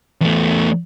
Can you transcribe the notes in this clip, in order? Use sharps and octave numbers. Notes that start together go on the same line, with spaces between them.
E2 A3